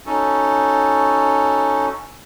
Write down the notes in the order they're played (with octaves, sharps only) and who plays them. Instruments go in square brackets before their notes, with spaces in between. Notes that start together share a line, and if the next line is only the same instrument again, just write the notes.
[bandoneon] C#4 D#4 F#4 A4